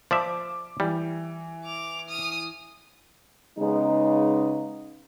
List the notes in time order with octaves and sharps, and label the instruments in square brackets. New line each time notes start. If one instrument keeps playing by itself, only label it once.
[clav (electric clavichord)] F3 D5 E5 [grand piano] D6
[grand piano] E3 [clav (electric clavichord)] G3
[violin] D6 F7
D#6 F6
[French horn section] C#3 G#3 B3 D#4